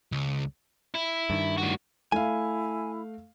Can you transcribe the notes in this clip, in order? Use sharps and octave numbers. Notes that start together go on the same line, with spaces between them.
C#2
E4
G2 D#3
A2 F#4
A3 E4 F5 G#5